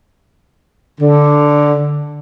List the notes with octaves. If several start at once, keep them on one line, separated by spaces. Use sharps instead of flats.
D3